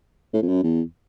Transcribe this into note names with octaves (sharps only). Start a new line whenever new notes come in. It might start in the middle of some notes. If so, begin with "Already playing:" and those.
A2
F2
F#2
E2